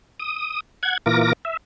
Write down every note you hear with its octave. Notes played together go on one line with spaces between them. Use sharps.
D#6
F#5 G#6
A#2 E3 F4 A#4 D6 A#6
E5